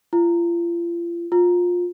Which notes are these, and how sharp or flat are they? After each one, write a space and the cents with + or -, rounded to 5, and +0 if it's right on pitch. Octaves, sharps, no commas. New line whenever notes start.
F4 -40
F4 +20